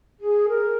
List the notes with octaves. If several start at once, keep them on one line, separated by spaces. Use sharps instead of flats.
G#4
A#4